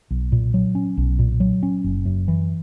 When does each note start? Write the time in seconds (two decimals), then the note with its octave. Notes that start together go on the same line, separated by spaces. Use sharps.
0.10 B1
0.32 A#2
0.54 F#3
0.75 C#4
0.97 B1
1.19 A#2
1.40 F#3
1.63 C#4
1.84 F#1
2.05 F#2
2.28 E3